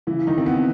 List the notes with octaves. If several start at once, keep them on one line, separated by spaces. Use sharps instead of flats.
C#3 E3 E4
D#3 D#4
C4
B3